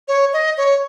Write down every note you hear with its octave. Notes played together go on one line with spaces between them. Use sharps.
C#5
D#5
C#5